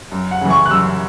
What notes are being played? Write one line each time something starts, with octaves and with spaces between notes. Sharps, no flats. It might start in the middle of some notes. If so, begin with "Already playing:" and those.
F#2
F#5
C#3 E3
C#6
F#6
F#2 E6